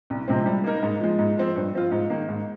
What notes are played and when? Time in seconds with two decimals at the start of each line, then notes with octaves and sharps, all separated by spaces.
0.10 C2
0.28 C3 F3 G#3 C4
0.46 G3
0.64 A#3 D#4 A#4
0.83 G#2
1.00 F3 G#3
1.19 G#2
1.37 F3 C4
1.56 G2
1.73 F3 C4 F4
1.92 G#2
2.10 D#3 A#3
2.29 G#2